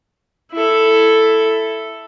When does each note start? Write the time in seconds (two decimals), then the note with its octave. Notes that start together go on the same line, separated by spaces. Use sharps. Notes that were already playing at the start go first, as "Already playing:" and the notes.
0.52 E4 A4